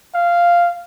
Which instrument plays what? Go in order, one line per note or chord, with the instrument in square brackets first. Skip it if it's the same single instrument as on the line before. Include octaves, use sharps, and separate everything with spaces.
[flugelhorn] F5